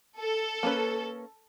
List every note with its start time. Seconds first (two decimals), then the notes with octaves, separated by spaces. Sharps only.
0.21 A4
0.63 A#3 C#4 B4